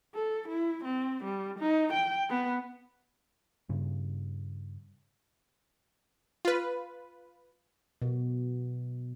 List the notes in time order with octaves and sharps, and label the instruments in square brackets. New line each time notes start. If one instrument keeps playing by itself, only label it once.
[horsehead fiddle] A4
E4
C4
G3
D#4
G5
B3
[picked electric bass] G2 C#3
[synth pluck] F4 B4
[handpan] B2